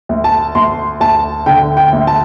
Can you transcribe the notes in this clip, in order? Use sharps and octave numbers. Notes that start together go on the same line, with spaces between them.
D2
A5
D2 C6
D2 A5
D3 G5
G5
D2
A5